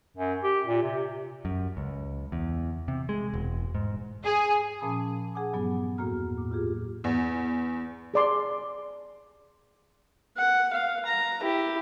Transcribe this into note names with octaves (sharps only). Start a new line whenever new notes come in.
F#2
G4
A#2
C3
F#2
C#2
E2
C3
G#3
E1
G#2
G#4
A#2 F3 C#4 A5 B5 D#6
G#4 F#5 G#5 D6 D#6
G2 E3 F#3 B3
E2 A2 A#3 F#4 A#5 F6
D6
F4 G4 G#4
E2
G#4 D5 C6
F#5
F5
A#5
E4 G4